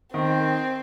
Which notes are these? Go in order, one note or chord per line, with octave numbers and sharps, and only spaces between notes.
D#3 C4